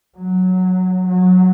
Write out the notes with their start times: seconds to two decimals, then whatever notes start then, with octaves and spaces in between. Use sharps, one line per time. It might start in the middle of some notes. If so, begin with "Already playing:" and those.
0.17 F#3
1.08 F#3